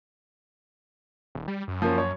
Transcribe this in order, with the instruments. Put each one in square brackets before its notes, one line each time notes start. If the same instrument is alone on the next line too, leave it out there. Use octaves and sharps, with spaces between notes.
[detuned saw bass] D#1
G3
F#2
[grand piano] F3 A#3 C#4
C#5